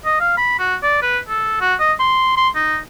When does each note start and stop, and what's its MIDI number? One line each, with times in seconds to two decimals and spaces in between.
0.05 0.18 75
0.20 0.34 77
0.37 0.58 83
0.59 0.75 66
0.83 1.01 74
1.02 1.19 71
1.29 1.59 69
1.61 1.75 66
1.80 1.93 75
1.99 2.33 84
2.37 2.49 84
2.55 2.77 63